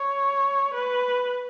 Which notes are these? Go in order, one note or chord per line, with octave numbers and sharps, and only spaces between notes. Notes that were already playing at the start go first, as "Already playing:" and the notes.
Already playing: C#5
B4